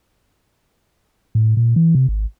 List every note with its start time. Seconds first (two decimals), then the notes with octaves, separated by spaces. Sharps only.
1.35 A2
1.57 A#2
1.76 E3
1.95 C3
2.08 G#1